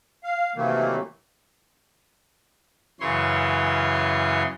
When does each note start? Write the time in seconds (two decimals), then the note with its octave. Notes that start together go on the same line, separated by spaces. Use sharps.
0.24 F5
0.55 C3 D#3 E3 F#3 A3 A#3
3.00 F#2 C#3 E3 C#5 C6